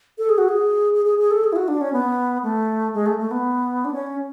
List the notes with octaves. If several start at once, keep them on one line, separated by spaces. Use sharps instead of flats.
A4
G#4
F#4
G#4
G#4
G#4
G#4
A4
G#4
E4
F#4
D4
C#4
B3
A3
G#3
A3
A3
B3
D4
C#4